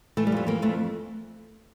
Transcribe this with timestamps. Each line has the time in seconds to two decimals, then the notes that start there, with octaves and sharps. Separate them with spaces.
0.17 E3 A3
0.27 G3
0.32 F2 A3
0.47 E3 A#3
0.62 F2 A3